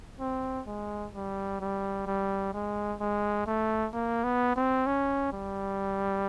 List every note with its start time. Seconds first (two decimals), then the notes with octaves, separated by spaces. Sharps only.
0.20 C4
0.67 G#3
1.14 G3
1.60 G3
2.07 G3
2.53 G#3
3.00 G#3
3.47 A3
3.93 A#3
4.24 B3
4.56 C4
4.86 C#4
5.32 G3